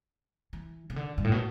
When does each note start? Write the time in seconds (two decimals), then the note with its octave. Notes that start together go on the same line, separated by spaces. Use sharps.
0.53 E3
0.90 C#3
0.96 D3
1.18 G2
1.24 A2
1.32 B2